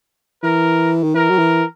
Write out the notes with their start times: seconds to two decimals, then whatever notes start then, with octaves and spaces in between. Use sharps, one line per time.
0.43 E3 A#4
1.03 D#3
1.15 E3 A#4
1.30 F#3
1.38 E3